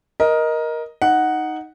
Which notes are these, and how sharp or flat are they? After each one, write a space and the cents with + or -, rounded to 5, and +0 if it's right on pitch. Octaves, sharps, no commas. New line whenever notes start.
A#4 +15 D#5 +5
D#4 +0 F#5 +0